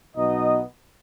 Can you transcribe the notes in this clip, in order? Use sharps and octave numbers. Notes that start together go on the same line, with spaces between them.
B1 B2 B3 D#4 D#5